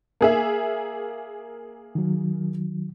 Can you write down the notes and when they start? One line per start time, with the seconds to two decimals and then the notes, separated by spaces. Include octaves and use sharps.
0.21 A#3 G#4 E5
1.95 D#3 F#3